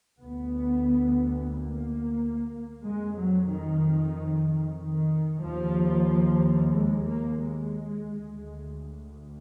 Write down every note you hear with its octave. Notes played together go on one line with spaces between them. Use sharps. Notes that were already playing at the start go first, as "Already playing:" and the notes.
D2 B3
A#3
F2 G#3
F#3
D#3
D#3
D#2 F3
G#3
A#3
G#3
D2